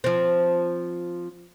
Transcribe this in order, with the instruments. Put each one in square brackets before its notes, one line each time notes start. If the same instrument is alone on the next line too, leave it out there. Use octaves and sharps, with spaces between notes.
[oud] F3 C4